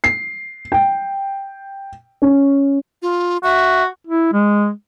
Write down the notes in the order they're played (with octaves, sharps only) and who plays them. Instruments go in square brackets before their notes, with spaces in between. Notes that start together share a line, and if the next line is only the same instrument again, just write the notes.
[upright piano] C7
G5
C#4
[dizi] F4
[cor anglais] F#4 [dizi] E5
[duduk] E4
G#3